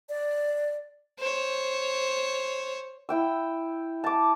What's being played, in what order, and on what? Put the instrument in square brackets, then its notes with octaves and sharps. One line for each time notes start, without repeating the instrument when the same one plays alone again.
[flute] D5
[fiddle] C5 C#5
[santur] E4 G5 E6
A5 D6